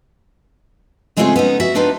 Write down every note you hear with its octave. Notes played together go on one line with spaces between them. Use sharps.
C#3 G#3 A3 C4 F4 G#4
B3 C#4 D#4
F#4 E5
A#3 B3 D4 D#4 F4 B4